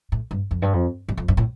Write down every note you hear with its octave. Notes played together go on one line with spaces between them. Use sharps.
A2
G2
F2
G2
F2
G2
F2
G2
A2